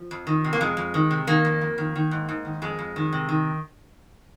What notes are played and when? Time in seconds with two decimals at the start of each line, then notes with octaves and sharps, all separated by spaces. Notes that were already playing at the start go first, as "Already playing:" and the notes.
Already playing: F3
0.11 F2
0.27 D#3
0.44 C3
0.53 A#3
0.61 F2 G#3
0.77 F2
0.94 D#3
1.11 C3
1.27 D#3 A#3
1.45 F2
1.61 F2
1.78 D#3
1.95 D#3
2.11 G#2
2.29 G#2
2.45 D#3
2.62 F2 G#3
2.79 F2
2.96 D#3
3.13 C3
3.29 D#3